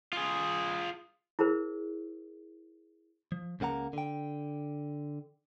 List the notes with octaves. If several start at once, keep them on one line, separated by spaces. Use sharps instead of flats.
F4 G#4
E4 G#4 A#4 C5
F3
C#2 C#3 A#3 F#5 A#5
D3 G5